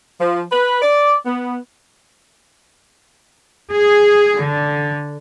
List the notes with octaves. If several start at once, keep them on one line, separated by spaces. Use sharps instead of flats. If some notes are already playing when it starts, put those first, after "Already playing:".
F3
B4
D5
B3
G#4
D3